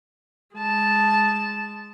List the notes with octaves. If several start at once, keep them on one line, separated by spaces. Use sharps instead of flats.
G#3 A5